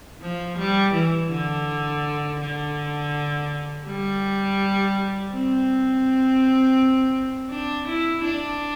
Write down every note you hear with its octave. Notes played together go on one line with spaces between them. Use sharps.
F3
G3
E3
D3
D3
G3
C4
D4
E4
D4